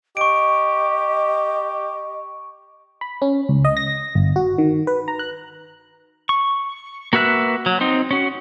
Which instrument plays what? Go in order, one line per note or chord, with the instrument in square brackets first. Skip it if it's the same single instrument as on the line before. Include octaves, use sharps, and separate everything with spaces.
[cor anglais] G4 [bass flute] D#5 [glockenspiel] C#6 D7
[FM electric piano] B5
C#4
C#2
D#5
A#6
G1
F#4
D#3
B4
A#5
F#6
[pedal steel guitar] C#6
A#3 F#4 B4 E5 F#6
F#3
C4 D#4 C5
C#4 F#4